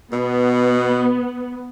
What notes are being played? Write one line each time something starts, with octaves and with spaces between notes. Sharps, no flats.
B2 B3